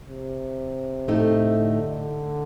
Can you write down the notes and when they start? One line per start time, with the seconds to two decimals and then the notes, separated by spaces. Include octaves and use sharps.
0.09 C3
1.08 A2 A3 D#4
1.58 D3